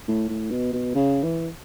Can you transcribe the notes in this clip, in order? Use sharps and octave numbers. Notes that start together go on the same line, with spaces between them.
A2
A2
B2
B2
C#3
E3